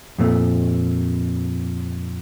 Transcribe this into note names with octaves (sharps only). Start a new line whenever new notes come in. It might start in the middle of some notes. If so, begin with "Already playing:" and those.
F2 A#2 A3